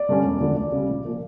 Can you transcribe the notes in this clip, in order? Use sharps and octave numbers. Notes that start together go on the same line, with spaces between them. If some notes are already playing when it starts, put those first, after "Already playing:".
Already playing: D5
G2 D3 G3 C#4
E1
D2 D3 F3
D2 D5
C#3 G3
A#1
A#2 F3 A#3